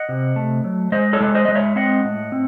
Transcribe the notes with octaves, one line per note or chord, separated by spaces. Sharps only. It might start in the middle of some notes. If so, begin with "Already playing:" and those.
Already playing: D#5 F#5
C3
A3
F#3
G#3 C5 D#5
A4 C#5
G#3
C5 D#5
G#3 D#5
C#5 E5
C4 D#5 F#5
A2
C4